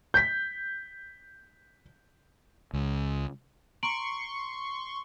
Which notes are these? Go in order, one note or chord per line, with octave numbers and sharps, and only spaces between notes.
G6 B6
C#2
A#5 C6 C#6 D7 F#7